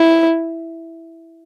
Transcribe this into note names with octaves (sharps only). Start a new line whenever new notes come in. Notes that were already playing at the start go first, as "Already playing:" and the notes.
Already playing: E4